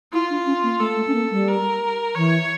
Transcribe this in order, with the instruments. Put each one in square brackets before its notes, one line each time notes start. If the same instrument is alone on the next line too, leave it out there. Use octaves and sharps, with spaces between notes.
[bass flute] E4 [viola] F4
[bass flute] D4
C#4
A#3
[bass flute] A3 [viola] A4
[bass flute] A3
C#4
A#3
G3
[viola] A#4
[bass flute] E3 [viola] C#5